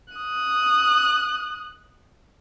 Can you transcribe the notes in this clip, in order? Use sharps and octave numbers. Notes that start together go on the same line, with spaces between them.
D#6 F#6